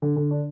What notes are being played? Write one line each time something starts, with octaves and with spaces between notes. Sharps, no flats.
D3
D3
D4